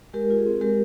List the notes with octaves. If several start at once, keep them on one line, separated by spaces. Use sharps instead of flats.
G#3 G4 A#4
F4
G#4
C4
G#3 G4 A#4